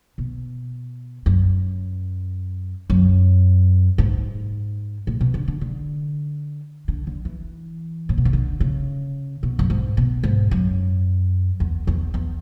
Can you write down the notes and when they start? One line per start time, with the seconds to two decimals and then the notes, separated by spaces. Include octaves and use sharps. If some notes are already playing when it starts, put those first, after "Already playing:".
0.18 B2
1.26 F#2
2.90 F#2
3.98 G#2
5.07 A2
5.21 B2
5.34 D3
5.48 D3
5.61 D3
6.88 D3
7.07 D3
7.25 E3
8.09 A2
8.18 B2
8.25 C#3
8.33 D3
8.60 C#3
9.43 B2
9.59 F#2
9.70 G#2
9.97 B2
10.24 G#2
10.51 F#2
11.60 E2
11.87 E2
12.14 E2